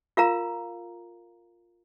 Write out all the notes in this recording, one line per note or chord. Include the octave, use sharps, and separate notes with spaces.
F4 A#4 F5 A#5